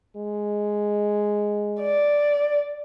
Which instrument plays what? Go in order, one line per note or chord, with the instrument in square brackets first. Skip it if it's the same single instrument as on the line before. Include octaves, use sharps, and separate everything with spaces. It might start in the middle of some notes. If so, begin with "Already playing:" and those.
[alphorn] G#3
[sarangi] D5